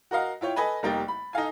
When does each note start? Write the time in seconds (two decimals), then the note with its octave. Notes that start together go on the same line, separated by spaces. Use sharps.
0.11 F#4 A#4 D#5 F5 F#5
0.41 E4 F4 C#5 G5
0.56 A4 B4 D#5 G#5 B5
0.83 F1 G3 A#3 D#4 G5 A6
1.08 B5
1.33 D#4 A4 F5 G#5